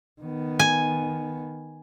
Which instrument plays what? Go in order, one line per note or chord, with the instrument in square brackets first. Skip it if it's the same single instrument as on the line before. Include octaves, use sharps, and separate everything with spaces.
[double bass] D#3 B3
[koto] G#5